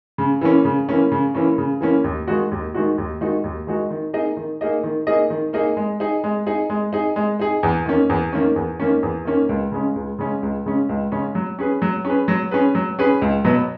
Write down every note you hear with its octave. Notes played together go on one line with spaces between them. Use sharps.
C#3
E3 A#3 C#4
C#3
E3 A#3 C#4
C#3
E3 A#3 C#4
C#3
E3 A#3 C#4
D#2
D#3 G#3 D#4 F#4
D#2
D#3 G#3 D#4 F#4
D#2
D#3 G#3 D#4 F#4
D#2
D#3 G#3 D#4 F#4
D#3
A#3 D#4 G#4 D#5
D#3
A#3 D#4 G#4 D#5
D#3
A#3 D#4 G#4 D#5
D#3
A#3 D#4 G#4 D#5
G#3
D#4 G#4
G#3
D#4 G#4
G#3
D#4 G#4
G#3
D#4 G#4
E2
D#3 A#3 C#4
E2
D#3 A#3 C#4
E2
D#3 A#3 C#4
E2
D#3 A#3 C#4
C#2
C#3 G#3 C#4
C#2
C#3 G#3 C#4
C#2
C#3 G#3 C#4
C#2
C#3 G#3 C#4
F#3
C#4 G#4 B4
F#3
C#4 G#4 B4
F#3
C#4 G#4 B4
F#3
C#4 G#4 B4
C#2
B2 F#3 B3